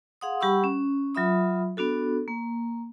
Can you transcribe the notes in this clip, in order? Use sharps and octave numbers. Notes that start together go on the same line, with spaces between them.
G#4 F5 F#5 C6 D#6
G3 G4 F#5 B5 C#6 E6
C#4
F#3 F4 E5 B5 D#6
B3 D4 F#4 A4
A#3